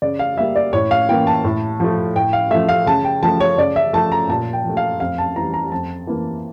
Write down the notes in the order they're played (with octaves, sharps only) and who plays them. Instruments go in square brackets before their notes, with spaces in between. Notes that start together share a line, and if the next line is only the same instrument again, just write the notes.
[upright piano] C#3 D5
F5
G3 A#3 E5
D5
A2 C#5
F5
E3 A#3 G5
A5
A2
F3 A3
A2 G5
F5
F3 A3 E5
F5
C#3 A5
G5
F3 A3 A5
C#5
C#3 D5
E5
F3 A3 A5
A#5
A#2 A5
G5
F3 A3
F5
F2 F5
A5
E3 G3 A#5
A#5
F2 A5
E3 A#3